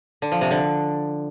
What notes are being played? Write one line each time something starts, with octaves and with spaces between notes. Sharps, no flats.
D3
F3
C3
D3